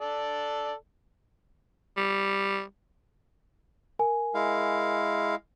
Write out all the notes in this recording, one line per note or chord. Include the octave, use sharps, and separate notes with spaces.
A4 D5
G3
A#4 G#5
G#3 E4 F5